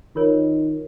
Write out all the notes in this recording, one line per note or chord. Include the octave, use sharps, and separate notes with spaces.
D#3 F4 A#4 C#5